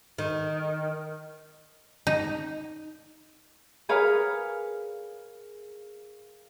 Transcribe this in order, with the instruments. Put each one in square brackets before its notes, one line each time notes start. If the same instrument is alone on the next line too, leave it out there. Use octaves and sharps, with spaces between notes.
[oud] D#3
[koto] D#4
[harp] G#4 A#4 B4 C#5 F5